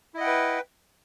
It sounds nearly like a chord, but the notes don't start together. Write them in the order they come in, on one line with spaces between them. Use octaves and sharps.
E4 D#5 F#5 G5 B4